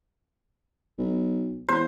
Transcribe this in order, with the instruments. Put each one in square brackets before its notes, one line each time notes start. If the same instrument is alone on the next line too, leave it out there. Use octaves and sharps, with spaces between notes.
[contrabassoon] B1
[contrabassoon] E2 [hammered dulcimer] C5